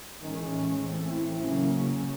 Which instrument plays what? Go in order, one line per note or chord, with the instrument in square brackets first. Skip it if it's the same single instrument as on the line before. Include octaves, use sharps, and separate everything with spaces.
[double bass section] A2 E3 G#3 C#4 [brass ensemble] D#3
[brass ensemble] A3
[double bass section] E3 A3 C4
[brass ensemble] E4
[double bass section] C#3 F#3 A#3 C#4